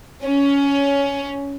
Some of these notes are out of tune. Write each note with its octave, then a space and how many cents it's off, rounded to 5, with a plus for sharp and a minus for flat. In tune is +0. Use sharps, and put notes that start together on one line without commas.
C#4 +15